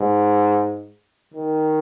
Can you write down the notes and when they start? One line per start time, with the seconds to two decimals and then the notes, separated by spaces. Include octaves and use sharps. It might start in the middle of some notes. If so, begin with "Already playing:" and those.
Already playing: G#2
1.34 D#3